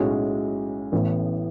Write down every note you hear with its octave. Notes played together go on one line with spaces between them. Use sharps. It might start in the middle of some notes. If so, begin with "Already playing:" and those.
Already playing: B1 A2 G#3 C#4 F#4
A1 A2 E3 B3